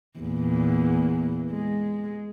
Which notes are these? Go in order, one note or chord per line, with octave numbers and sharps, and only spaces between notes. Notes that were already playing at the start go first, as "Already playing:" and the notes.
E2 A#2
G#3